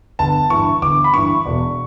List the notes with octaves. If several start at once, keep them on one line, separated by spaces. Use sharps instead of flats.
G1 A5
G2 E3 C#6
G1 D6
B5
G2 E3 C#6
E1